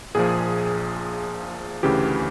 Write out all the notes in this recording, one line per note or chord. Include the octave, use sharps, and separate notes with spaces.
A#1 A#2 F3 G#4
D2 C#3 E3 G4